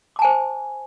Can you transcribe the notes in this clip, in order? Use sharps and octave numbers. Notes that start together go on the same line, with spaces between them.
C5 G#5 A5 D6